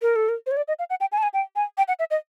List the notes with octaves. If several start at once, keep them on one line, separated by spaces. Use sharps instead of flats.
A#4
A4
A#4
C5
C#5
D5
D#5
F5
F#5
G5
G#5
A5
G#5
G5
G#5
G5
F#5
E5
D#5